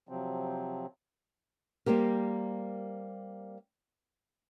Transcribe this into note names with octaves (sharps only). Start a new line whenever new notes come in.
C3 F3 F#3 C4
G3 A#3 C4 G4 A#4